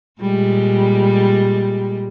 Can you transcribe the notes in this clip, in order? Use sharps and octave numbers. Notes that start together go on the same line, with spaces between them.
A#2 G3 G#3